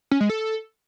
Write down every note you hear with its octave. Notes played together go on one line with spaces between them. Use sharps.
C#4
G#3
A4